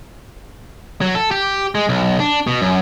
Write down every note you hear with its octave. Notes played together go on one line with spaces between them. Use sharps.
F#3
A4
G4
G#3
B1
D4
B2
F#2